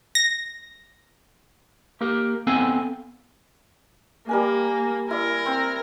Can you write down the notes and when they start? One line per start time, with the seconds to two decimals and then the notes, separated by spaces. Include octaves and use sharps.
0.15 A#6
2.01 A#3 G4 A#4
2.47 B3 C4 A4 F5 G#5
4.29 G3 A#3 A#4 G#5
5.11 E4 A#4 D5
5.46 C4 E6